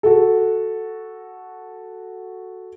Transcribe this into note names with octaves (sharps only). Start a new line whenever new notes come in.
F#4 A4